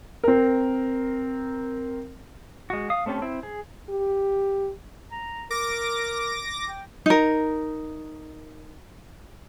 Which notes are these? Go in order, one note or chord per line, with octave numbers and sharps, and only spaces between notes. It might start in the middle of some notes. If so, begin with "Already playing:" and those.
C4 A#4
G#3 F#4
F5 D#6
A3 C4 C#4 G4 A4
C4 E4
G#4
G4
A#5
A#4 D6 A#6
G5
D#4 A#4